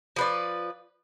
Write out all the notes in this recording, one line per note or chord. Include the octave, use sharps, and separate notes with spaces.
F3 B4 D5